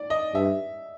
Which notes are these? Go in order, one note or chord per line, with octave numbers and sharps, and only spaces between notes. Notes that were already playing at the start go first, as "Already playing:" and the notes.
Already playing: D5
D#5
G2 E5